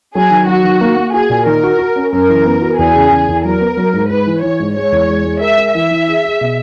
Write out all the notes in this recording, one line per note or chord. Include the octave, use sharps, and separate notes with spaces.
F#3 G#4
D#3
F#3 F#4
D#3
A#3
A#3
F#4 G#4
A#2
D#3 A#4
F#4
F#4
C#4
F#2 A#4
E3
B3
F#4
E2 G#4
C#3
E2
E2
F#3 A#4
B3
F#3
G#2
G#2 B4
E3
E3 C#5
G#2
G#3 C#5
E2
G#3
G#3
A#4 E5
A#4
E3 E5
E3
G#4
G#4
B2